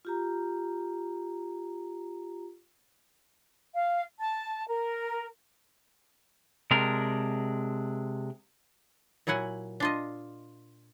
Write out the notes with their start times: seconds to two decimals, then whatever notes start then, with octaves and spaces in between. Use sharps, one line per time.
0.05 F4 G4 A#5
3.74 F5
4.19 A5
4.68 A#4
6.71 C3 G#3 D4 A#4
9.27 A#2 F#3 E4 F#5 G#5
9.80 D4 F4 D#5